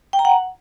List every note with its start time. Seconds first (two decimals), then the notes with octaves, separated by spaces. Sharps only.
0.13 G5
0.19 A#5
0.25 F#5